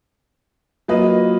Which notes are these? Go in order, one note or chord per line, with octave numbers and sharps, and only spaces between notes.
F#3 A#3 F4 B4 D#5